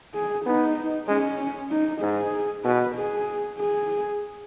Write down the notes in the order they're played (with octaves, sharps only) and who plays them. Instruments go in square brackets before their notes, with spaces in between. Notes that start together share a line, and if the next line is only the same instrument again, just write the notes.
[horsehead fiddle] G#4
[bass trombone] B3 [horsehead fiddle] D#4
[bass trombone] G#3 [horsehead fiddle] C#4
[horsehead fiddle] D#4
[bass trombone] G#2 [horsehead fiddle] G#4
[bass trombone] B2 [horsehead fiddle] B4
[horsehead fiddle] G#4
G#4